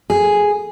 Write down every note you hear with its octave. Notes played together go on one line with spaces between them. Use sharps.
G#4